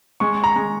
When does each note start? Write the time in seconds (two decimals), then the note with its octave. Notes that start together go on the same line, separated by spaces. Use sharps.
0.20 G#3 C#6
0.44 A#5
0.56 G#3